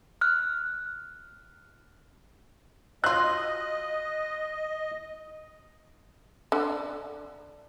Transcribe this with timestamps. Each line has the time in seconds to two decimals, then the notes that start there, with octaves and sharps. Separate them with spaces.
0.21 F6 F#6
3.04 F#3 F4 D#5 F#6
6.52 D3